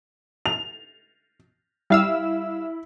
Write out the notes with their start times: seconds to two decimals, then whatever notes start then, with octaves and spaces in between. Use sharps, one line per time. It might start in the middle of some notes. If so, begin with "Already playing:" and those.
0.46 F7
1.90 G3 E4 F5 E6